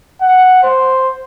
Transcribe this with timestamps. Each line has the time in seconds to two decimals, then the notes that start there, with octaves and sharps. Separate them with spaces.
0.22 F#5
0.63 C5